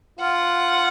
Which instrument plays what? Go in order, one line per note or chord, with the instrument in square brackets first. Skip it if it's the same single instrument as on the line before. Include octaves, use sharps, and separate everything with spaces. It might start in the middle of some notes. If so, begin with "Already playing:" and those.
[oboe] F4 [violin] F#5